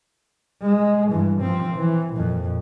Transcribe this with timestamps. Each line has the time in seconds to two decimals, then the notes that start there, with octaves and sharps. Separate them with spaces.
0.62 G#3
1.11 G2 E3
1.41 F3 C4
1.75 E3
2.14 F2 A#2